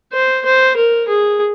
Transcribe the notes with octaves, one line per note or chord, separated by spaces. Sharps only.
C5
C5
A#4
G#4